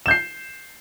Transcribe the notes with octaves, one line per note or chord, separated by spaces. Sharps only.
G6 C7 E7